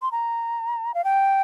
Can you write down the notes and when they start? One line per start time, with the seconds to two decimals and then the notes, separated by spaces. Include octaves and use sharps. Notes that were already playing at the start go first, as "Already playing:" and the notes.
0.02 C6
0.12 A#5
0.94 F5
1.04 G5